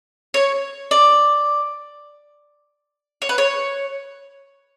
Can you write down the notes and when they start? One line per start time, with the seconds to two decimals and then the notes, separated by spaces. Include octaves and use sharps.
0.34 C#5
0.91 D5
3.22 C#5
3.29 B4
3.38 C#5